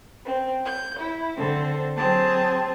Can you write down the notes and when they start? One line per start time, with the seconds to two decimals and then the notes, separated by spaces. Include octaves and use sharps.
0.24 C4
0.65 G6
0.98 E4
1.36 D3 C4 A4 C5
1.97 F#3 C4 G#4 A5